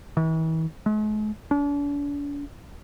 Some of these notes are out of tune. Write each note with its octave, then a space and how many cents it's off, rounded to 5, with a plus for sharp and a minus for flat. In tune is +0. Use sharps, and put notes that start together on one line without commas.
E3 -40
G#3 +45
D4 -40